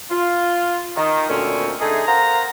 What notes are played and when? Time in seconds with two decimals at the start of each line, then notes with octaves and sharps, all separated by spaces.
0.11 F4
0.96 D#3
1.29 D2 A#2 C4 C#4
1.80 D3 A3 D#4 G#4
2.06 A#4 C5 F5 F#5 A#5